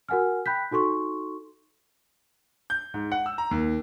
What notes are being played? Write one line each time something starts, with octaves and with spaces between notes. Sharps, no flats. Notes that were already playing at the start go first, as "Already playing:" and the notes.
F#4 A#4 F#5 G#5 F6
G5 B5 F#6 G6 B6
D#4 F#4 A4 C6 C#6
G6
G#2
F#5
E6
A#5
D#2